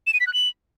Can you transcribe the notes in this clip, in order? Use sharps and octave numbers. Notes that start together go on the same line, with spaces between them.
E7
D#7
B6
F#6
F#7